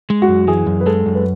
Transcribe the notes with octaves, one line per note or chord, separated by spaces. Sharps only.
G#3
F#4
F#2
E3 G#4
F#2
B4
G#3 A4
F#2
B4